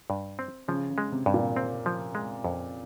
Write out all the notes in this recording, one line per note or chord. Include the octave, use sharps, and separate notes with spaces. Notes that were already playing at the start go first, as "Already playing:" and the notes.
G2
C4
C#3 F3
C#3
G#3
C3
G2
A#2
C4
F3
G#3
F2